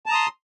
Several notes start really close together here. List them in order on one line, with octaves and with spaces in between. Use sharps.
A5 A#5 D#6 C6